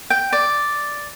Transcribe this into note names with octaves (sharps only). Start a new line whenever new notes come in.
G5
D5